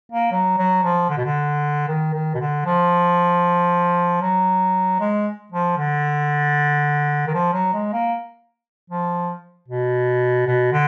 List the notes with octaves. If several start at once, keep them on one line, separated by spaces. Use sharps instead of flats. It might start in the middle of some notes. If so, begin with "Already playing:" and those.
A#3
F#3
F#3
F3
D3
B2
D3
D#3
D#3
B2
D3
F3
F#3
G#3
F3
D3
D#3
F3
F#3
G#3
A#3
F3
B2
B2
D3